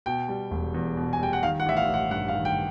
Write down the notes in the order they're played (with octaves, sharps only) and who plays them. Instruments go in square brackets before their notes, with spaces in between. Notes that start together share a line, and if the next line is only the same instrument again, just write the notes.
[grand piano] B2 G5
G3
E1
E2
B2
G#5
G3 G5
F#5
D#3 F5
F#5
A1 E5
F5
A1
F#5
G2 F#5
F5
D#3
G5